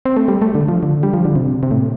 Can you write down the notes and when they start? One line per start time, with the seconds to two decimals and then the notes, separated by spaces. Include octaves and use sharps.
0.05 C4
0.17 A3
0.28 G3
0.42 A3
0.55 D3
0.68 F3
0.83 D3
1.03 G3
1.14 F3
1.25 D3
1.36 C3
1.63 C3
1.71 A2